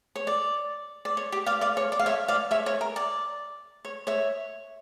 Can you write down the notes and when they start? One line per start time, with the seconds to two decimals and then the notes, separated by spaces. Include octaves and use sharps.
0.15 C#5
0.27 D5
1.05 D5
1.17 C#5
1.32 G4
1.46 D5 F5
1.61 D5 F5
1.77 C#5
1.92 D5
1.99 F5
2.06 C#5 E5
2.28 D5 F5
2.51 C#5 E5
2.66 C#5
2.81 A#4
2.96 D5
3.85 C#5
4.07 C#5 E5